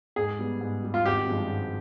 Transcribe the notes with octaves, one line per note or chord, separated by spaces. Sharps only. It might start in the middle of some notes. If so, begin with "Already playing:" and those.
G#2 G#4
G3 B3
G#2
G3 B3
F4
G#1 G4
G2 F3 G#3 D4
G#1